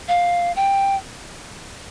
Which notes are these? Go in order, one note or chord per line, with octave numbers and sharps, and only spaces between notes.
F5
G5